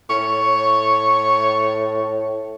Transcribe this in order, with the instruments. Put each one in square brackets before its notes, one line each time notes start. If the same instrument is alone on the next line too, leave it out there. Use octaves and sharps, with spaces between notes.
[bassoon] A2 [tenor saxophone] C#5